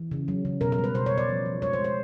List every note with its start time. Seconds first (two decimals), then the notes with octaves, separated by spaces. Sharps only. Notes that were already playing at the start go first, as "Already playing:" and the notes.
Already playing: E3
0.11 C#3
0.28 F#3
0.45 C#3
0.61 B2 A#4
0.72 A#4
0.78 G3
0.84 B4
0.94 B2 C5
1.06 C#5
1.12 B2
1.18 D5
1.29 F3
1.46 F3
1.62 G#3 C#5
1.73 C5
1.79 G#3
1.84 C5